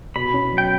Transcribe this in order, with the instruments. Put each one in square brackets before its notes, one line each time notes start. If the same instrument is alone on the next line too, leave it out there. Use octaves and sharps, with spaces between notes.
[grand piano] B2 [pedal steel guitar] B5
[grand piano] C#4
F#3
[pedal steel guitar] G5